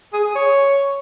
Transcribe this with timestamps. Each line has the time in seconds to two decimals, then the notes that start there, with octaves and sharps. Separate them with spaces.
0.13 G#4
0.24 G#4
0.35 C#5